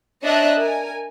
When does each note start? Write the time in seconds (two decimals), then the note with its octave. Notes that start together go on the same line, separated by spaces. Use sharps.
0.23 D4 C#5 D#5 E5 A#5 F#6
0.56 A#4 G#5